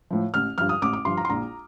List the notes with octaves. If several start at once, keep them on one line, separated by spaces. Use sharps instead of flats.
A2 F3
A1 F6
G2 F3 F6
D#6
A1 D6
D6
G2 F3 C6
A#5
C6
A#1 A#5